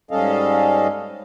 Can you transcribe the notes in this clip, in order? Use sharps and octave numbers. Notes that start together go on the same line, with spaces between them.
G#2 G3 C#4 A4 D#5 F5